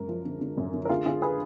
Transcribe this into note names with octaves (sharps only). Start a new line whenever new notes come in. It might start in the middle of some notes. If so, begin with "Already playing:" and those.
Already playing: F#2 G#3 A#4
F3
D3
D3
F#2
D3
A#4
D2 F4 G#4
D3 F4 G#4
G#4 B4